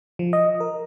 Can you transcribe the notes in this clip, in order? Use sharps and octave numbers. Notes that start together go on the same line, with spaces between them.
F3
D#5
A#4